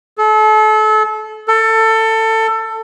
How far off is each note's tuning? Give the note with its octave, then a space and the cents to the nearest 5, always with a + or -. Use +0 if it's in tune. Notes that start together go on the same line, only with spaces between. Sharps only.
A4 -35
A4 +20